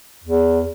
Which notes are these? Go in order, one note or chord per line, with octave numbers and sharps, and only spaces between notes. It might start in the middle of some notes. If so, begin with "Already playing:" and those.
E2